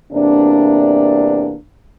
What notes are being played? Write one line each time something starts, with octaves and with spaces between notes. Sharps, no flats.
E2 C3 A#3 D4